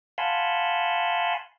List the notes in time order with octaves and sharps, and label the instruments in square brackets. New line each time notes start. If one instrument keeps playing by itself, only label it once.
[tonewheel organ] F5 F#5 G#5 A5 B5 C6